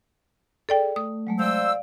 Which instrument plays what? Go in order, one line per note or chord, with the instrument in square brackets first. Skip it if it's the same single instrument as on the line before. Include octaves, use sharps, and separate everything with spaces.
[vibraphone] G#4 [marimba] A4 D5 G5
[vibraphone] A3 [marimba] D#6
[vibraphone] F#3 G#3 A3
[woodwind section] C3 C5 E6 [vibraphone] D5 F5